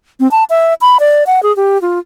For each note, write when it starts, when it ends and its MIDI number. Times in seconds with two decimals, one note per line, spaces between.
0.20 0.30 60
0.31 0.44 81
0.50 0.74 76
0.81 0.97 83
1.00 1.24 74
1.27 1.43 78
1.43 1.55 68
1.57 1.80 67
1.82 1.99 65